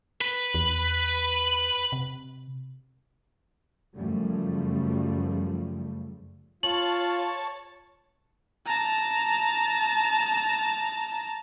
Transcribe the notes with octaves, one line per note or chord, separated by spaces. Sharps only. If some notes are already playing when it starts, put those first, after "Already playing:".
B4
E2
C3
F#2 C#3 F3 G3 A3
F4 C#5 A5 F#7
A5 A#5